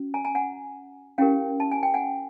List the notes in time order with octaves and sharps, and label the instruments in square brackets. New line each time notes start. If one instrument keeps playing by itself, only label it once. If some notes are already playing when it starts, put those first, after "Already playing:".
Already playing: [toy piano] C#4 F#4
G#5 A#5
G#5 A#5
F#5 G#5
C#4 E4 G4 A#4 F5 G5
A5
G#5
G5
F#5 G#5